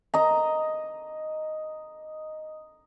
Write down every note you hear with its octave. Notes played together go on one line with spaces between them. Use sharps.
D#5 A#5